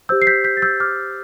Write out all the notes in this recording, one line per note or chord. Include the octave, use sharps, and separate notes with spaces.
G4 C5 E6 G6
C7
G6 B6
G6 B6
A6
E6 G6
D6 F6